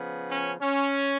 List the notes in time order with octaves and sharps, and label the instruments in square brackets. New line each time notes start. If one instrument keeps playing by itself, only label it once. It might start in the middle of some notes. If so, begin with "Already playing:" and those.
Already playing: [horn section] C#3 F3 B3
C#4
C#4